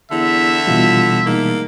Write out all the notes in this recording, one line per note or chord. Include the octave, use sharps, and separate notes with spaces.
E2 D3 E5
B2 E3 F3 G3
G#2 A#3